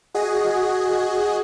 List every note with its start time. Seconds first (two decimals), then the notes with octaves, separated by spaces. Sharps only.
0.14 F#4 G#4 D#5